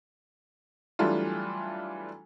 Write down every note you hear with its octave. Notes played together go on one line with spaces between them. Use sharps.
E3 F#3 G3 A3 D4 F4